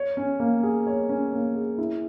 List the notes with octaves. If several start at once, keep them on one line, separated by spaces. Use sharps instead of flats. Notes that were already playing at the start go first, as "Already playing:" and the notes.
Already playing: C#5
C#4
A#3
G#4
C#5
C#4
A#3
G#4
E4